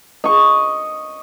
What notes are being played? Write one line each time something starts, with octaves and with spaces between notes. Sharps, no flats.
D#5 C#6